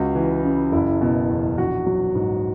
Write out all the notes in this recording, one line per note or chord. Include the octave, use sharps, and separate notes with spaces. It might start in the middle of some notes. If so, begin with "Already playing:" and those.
Already playing: C#2 F#4
E3
C#3
F#1 E4
B2
E2
A#1 F#4
F#3
G#2